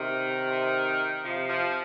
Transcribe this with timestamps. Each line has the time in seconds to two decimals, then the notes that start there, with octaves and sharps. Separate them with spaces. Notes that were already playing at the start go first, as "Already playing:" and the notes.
Already playing: C3 D#3
1.23 C3 F3
1.49 F3